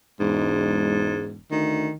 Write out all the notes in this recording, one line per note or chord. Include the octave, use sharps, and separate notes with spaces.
E1 G#2
D2 D#3